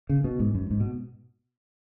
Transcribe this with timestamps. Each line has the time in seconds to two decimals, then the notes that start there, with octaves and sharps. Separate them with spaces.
0.09 C#3
0.24 B2
0.39 G#2
0.55 F#2
0.71 G#2
0.80 B2